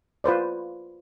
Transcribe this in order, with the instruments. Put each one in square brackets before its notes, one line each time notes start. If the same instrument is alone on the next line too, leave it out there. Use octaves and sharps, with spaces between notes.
[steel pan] F4 B4 C5 D5